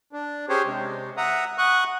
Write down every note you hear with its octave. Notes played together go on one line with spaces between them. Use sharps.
D4
C#4 G4 G#4 C5 C#5
C3 G#3
E5 F#5 A#5 D#6
F#5 C#6 D#6 F#6